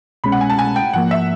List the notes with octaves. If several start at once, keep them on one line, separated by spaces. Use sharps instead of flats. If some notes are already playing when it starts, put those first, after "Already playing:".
C2 B2 G#3 C#4 B5
F#5
G#5
A5
G#5
G5
G#2 F3 A#3 F#5
E5